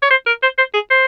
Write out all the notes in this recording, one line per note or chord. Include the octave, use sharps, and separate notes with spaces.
C#5
C5
A#4
C5
C5
G#4
C5